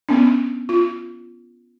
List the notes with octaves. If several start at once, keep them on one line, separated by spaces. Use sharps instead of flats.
B3 C#4 D4
F4